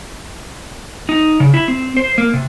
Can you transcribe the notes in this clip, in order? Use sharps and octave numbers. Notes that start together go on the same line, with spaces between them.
D#4
C#3
E4
C4
C5
A#3
C3